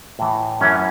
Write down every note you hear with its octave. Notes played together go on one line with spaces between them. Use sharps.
A2 E3
F#2 E3 C#4